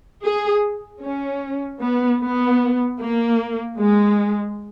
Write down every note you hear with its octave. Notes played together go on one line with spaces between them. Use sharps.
G#4
C#4
B3
B3
A#3
G#3